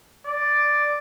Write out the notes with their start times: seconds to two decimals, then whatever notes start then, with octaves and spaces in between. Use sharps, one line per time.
0.27 D5